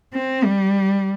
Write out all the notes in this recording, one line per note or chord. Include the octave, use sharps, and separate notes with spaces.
C4
G3